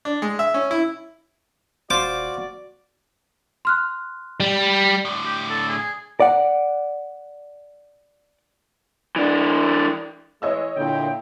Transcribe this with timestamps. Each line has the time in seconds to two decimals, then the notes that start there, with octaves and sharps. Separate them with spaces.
0.05 D4
0.22 G#3
0.39 E5
0.54 C#4
0.71 E4
1.90 D#1 F4 F#4 C5 D5 D6
3.65 C6 F6 F#6
4.40 G3
5.05 A2 D3
5.26 G4
5.50 A4
5.69 G#4
6.20 D5 F#5
9.16 E3 D4
10.42 E3 G#3 C#5 D#5 E6
10.77 A#2 D3 E4 G5